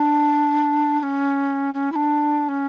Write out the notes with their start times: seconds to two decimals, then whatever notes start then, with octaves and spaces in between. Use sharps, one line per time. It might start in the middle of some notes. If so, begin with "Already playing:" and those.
Already playing: D4
1.00 D4
1.03 C#4
1.74 C#4
1.92 E4
1.96 D4
2.49 C#4